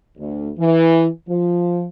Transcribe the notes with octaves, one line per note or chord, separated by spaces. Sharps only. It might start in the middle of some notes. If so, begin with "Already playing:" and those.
D2
E3
F3